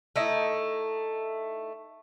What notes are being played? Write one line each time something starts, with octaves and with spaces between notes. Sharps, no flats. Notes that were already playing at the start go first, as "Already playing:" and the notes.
A3 D#4 E4